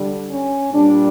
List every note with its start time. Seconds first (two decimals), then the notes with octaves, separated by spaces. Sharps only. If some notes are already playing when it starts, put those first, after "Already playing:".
Already playing: D3 G3
0.31 C#4
0.73 A#2 G3 D4